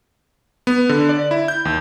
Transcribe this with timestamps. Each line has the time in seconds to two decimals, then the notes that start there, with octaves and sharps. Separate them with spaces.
0.67 B3
0.89 D3
1.09 D5
1.31 E4
1.48 G6
1.65 D#2